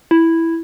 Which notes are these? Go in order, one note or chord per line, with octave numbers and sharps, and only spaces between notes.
E4